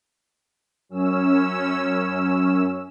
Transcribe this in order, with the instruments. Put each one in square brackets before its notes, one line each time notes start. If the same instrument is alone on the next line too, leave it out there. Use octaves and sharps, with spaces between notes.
[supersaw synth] F#2 C#4 E6